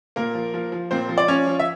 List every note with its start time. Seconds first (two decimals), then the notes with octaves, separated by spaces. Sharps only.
0.16 A#2 A#3 A#4
0.35 F3
0.54 F3
0.72 F3
0.91 A#2 C4 C5
1.09 F3
1.18 D5
1.28 F3 C#4 C#5
1.47 F3
1.59 E5